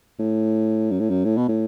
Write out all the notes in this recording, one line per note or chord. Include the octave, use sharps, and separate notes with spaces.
A2
F#2
A2
F#2
A2
B2
A2